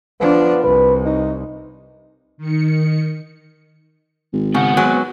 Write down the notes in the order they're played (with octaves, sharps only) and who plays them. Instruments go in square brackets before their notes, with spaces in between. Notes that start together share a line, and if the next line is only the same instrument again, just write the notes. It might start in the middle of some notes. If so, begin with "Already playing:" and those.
[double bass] F3 D4 [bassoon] B3
[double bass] C2 [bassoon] B4
[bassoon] D#4
[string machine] D#3 C#7
[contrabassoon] G#1
[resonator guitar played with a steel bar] C#3 [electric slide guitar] B3 C4 F#5
[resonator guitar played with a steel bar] F#3 G#3 B4